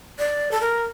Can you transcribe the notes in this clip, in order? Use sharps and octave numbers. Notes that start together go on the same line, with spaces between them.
D5
A4
A#4